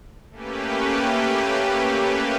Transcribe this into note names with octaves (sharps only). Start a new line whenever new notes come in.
A3 A#3 C#4 G4 B4